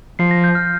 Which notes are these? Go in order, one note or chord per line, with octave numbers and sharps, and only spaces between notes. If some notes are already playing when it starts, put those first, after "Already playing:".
F3 C7
A#6
G6
F6